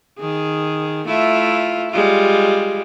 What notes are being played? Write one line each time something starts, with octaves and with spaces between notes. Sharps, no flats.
D#3 G#4
A3 E4 F4
G3 G#3 F4